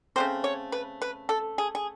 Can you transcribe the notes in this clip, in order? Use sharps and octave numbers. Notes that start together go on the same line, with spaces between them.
C#3 F#3 A3 C4 C5
C#5
B4
B4
A4
G#4
G#4